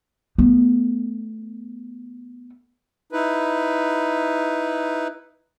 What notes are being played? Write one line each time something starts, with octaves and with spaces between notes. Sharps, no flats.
A3 B3
D#4 E4 B4